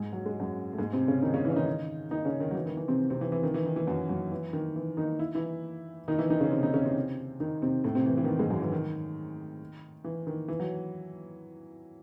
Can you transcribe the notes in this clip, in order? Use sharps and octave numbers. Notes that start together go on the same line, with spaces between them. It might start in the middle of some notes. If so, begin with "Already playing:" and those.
Already playing: G#2 G#3
F#3
G#3
F#2 F#3
A3
G#2 G#3
C3 C4
C#3 C#4
D#3 D#4
C#3 C#4
E3 E4
C#4
D#3 D#4
D#3 D#4
C#3 C#4
D#3
F#3
E3
D#3
E3
C3 C4
C3 C4
E3
E3
D#3
E3
D#3
E3
F#2 F#3
F#2 F#3
E3
D#3
E3
D#3 D#4
E4
E3 E4
D#3 D#4
E3 E4
D#3 D#4
C#3 C#4
C3 C4
D#3 D#4
C#3 C#4
C3 C4
D#3 D#4
C3 C4
A2 A3
C3 C4
E3
E3
D#3
E3
G#2 G#3
F#2 F#3
E3
D#3
E3
D#3
E3
F#3